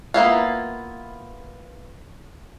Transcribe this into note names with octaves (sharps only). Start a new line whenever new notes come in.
A#3 B3 E4 F4